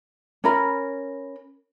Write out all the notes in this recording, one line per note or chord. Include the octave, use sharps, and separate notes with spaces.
C#4 A#4 B5